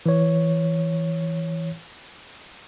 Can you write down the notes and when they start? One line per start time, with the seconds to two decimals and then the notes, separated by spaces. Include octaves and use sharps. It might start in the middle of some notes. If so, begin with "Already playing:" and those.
0.06 E3 C#5